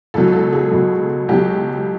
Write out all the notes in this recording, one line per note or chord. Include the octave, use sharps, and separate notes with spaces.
C#2 B2 F#3 A4
A4
G#4
C#2 B2 F#3
C#2 B2 F#3 G4